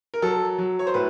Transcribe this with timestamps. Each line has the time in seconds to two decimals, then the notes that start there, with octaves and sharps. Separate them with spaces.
0.14 A#4
0.22 F#3 A4
0.58 F#3
0.79 C#5
0.87 C5
0.94 A2 B4